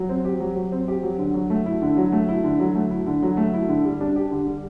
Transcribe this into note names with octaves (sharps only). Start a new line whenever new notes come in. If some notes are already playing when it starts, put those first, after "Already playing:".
Already playing: F#3
C4
G4
F#3
F#3
C4
G4
F#3
D3
F#3
A3
E4
D3
F#3
A3
E4
D3
F#3
A3
E4
D3
F#3
A3
E4
D3
G3
D4
G4
D3
G3